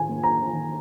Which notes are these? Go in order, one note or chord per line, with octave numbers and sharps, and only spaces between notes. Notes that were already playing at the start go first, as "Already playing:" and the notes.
Already playing: D#3 G#5
A#3
A#5
D#3